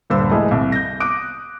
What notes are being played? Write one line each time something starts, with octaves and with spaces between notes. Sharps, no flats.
D#1 G2 D3 C5 E6
E3 G#3 A3 G#4 D#5
C2
G6 A#6
D6 D#6 F#6 D7